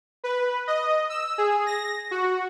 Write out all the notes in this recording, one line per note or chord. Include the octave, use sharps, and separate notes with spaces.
B4
D#5
E6
G#4
A#6
F#4